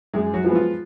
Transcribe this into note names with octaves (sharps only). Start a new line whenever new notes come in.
F#2 G#3 G#4
F#3 F#4
F3 G#3 B3
F4